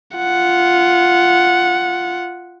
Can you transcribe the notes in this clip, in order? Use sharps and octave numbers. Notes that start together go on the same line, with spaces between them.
F4 F#5